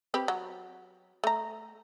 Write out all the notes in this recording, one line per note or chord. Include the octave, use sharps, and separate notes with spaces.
C4 G4 B4
F#3
A3 A#5